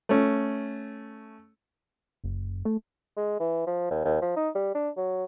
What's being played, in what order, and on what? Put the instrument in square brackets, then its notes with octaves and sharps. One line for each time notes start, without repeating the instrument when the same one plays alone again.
[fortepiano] A3 C#4
[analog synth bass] F#1
A3
[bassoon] G#3
E3
F3
D#2
D#2
F3
D#4
G3
D4
F#3